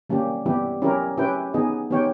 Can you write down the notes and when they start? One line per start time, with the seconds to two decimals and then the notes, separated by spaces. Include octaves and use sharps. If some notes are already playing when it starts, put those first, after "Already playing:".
0.10 G3 A#3 C#4 G4
0.45 G3 B3 E4 G4
0.82 C#4 E4 G4 A#4
1.18 C#4 E4 G4 B4 G5
1.54 B3 D#4 G#4 D#5
1.90 B3 D#4 G4 C#5 G5